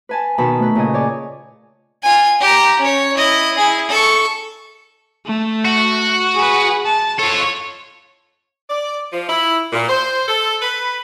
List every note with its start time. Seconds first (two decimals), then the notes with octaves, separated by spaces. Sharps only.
0.09 B4 G#5 A5
0.38 B2 D#3 A5 B5
0.59 A3 B4
0.75 A#2 C#3 D#5 G#5
0.93 G#4 C#5 D5
2.03 F4 G#5
2.41 G4 A#5
2.80 C#4 C#5
3.16 E4 D#5
3.57 E4 G#4
3.89 A4 C#6
5.26 A3
5.65 F#4
6.35 G#4 B4
6.86 A5
7.19 F4 A4 C#5
8.69 D5
9.12 F3
9.29 E4
9.72 A#2
9.89 C5
10.28 A4
10.62 B4